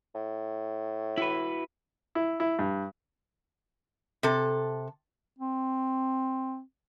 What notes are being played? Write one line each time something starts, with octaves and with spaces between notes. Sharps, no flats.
A2
E4 F#4 B4
E4
E4
G2
C3 A4
C4